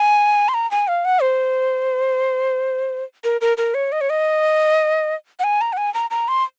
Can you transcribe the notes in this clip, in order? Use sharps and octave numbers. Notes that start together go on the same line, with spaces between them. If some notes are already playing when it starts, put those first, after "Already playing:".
Already playing: G#5
C6
A#5
G#5
F5
F#5
C5
A#4
A#4
A#4
C#5
D#5
C#5
D#5
F#5
G#5
A#5
F#5
G#5
A#5
A#5
C6